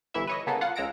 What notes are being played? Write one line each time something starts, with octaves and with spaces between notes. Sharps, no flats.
G1 E3 E4 E5
B4 C#5 D#5
C#3 A#3 B3 A4
F4 F5 F#5
C#2 G#3 A#5 E6 A#6 D7